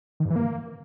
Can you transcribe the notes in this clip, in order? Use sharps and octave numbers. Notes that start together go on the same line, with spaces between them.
D#3
G2
E3
A#3